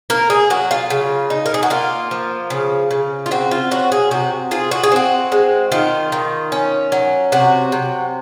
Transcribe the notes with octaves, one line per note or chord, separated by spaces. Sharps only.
A#3 A#4
G#4
F#3 F#4
F4
C#3
D#4
A#4
G#4
F#4
A#3 F4
F3
C#3
C#3
F4
C4 F#4
F4
F#3 F#4
G#4
C3 F#4
F4 G#4
F#4
G#4
C4 F#4
G#3
D#3 F4
D#3
C#4
F#3
C3 F#4
C3